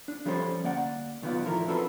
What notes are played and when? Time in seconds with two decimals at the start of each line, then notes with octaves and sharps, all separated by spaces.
0.08 D4
0.26 F3 G3 C#4 A4 C5
0.64 D2 A#3 D5 F#5
1.22 B1 D#3 B3 F4 D5
1.45 E2 A2 F3 A3 E4 A#4
1.68 C4 D4 F4 F#4 A4 B4